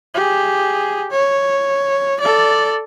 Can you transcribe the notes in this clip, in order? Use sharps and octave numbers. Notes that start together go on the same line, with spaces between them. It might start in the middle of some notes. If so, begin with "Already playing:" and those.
G4 G#4
C#5
A4 D5